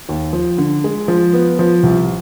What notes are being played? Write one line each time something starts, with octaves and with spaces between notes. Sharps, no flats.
D#2
F3
D3
G#3
F3
B3
F3
C2